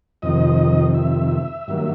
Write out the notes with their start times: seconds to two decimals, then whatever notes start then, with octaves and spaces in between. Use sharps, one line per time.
0.22 F2 C3 D#3 D#5
0.94 E5
1.67 G2 D#3 F#3 A#3